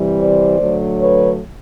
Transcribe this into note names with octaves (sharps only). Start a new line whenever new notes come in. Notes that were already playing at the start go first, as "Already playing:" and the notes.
Already playing: C3 E3 G3
C5 D5
D3 F#3 A3
B4 C#5